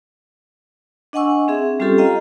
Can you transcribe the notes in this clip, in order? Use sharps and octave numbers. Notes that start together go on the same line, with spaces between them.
D4 D#5 F#5 G#5 C#6 E6
C4 G#4 E5
G3 C4 C#4 F4 G4 A4
F4 D#5 F5 G5 A#5